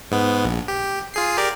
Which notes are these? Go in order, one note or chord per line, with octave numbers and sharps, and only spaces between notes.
G#2 B3
A#1
G4
F4 G#4 C7
G4 A#4 D5